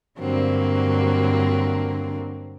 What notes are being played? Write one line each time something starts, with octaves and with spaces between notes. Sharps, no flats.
G2 D3 F#3 A#3 C4